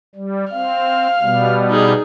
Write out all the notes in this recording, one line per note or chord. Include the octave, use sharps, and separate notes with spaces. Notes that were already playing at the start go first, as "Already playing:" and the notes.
G3
C4 F5 F6
B2 G3 B3
D#4 G#4